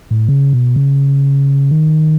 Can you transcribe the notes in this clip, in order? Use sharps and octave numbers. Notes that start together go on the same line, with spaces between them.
A2
C#3
B2
C#3
D#3